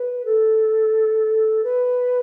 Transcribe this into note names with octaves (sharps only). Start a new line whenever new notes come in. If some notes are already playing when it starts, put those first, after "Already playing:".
Already playing: B4
A4
B4